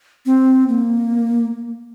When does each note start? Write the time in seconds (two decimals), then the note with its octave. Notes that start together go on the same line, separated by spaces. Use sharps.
0.26 C4
0.69 A#3